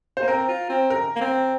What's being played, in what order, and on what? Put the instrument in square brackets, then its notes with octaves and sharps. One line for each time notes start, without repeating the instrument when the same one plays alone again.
[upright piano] C5
[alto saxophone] A#3
[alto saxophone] C4 [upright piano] A#4
[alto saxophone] F4
C4
[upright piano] A#4
[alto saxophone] A#3
C4